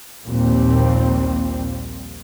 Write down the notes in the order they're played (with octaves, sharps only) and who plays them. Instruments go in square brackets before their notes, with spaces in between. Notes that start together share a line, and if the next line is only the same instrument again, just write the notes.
[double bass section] A#1 D#2 A#2 G3 C4